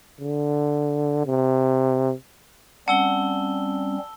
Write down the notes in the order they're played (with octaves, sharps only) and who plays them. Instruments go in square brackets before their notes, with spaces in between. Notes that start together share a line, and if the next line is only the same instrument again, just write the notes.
[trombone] D3
C3
[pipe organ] G3 C4 C#4 [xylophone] F#5 [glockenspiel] A5 E6 G7